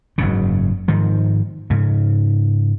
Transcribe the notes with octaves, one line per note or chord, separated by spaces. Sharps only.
F#1 G#2 C#3
G#2 D#3 F3
G#2 C#3